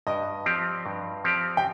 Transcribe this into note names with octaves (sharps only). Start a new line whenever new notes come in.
G2 D#5
F3 C4 G4 D5
G2
F3 C4 G4 D5
G5